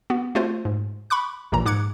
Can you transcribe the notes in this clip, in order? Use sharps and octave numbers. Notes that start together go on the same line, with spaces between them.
B3 F#4
A3 C4 F4 F#4 C5
G#2
B5 C#6 D6 F#6
A#1 D#2 A#2 E3 A#5
G#2 D6 F#6 G#6 C#7